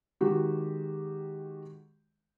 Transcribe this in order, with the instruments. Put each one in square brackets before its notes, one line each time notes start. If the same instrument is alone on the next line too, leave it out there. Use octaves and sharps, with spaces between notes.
[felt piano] D#3 G#3 F#4 G4